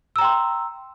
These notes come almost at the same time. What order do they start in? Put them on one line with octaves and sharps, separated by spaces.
E6 A#5 G5 C6